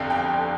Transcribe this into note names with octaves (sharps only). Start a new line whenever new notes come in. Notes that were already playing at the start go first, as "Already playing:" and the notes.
Already playing: G1 F2 D3 F5 G5
G5